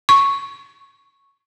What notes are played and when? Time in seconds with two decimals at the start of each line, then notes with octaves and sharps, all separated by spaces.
0.09 C#6